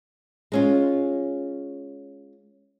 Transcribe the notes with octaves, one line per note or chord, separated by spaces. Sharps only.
G#3 C#4 F4